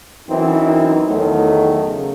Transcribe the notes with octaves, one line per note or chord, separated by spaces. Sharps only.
F#2 E3 C4 D#4
E2 D#3 F#3 A3
C#3